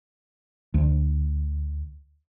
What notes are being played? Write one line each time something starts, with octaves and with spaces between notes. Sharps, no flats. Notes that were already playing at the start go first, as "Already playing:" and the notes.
D2